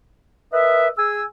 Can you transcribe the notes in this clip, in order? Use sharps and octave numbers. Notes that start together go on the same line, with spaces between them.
A#4 B4 D#5 E5
G#4 G#5 E6